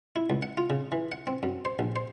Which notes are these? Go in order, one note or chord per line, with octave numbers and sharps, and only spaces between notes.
E4
C#2
F#5
F4
C#3
E3
F#5
C4
F#2
C5
A#1
C5